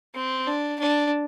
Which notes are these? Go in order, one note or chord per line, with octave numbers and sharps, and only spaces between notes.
C4
D4
D4